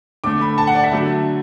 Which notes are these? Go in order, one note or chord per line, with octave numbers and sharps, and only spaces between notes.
D3 A3 D6
B5
A5
F#5
D5
E5
D3 F#3 A3